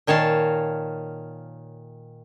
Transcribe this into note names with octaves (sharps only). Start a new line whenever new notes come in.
A#2 D#3 C#5 F5 A5